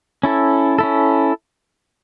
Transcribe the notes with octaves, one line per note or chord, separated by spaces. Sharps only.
C#4 E4 A4
C#4 E4 A4